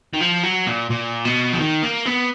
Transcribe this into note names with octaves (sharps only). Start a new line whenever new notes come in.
D#3
F3
F#3
A#2
A#2
B2
F3
D#3
A#3
B3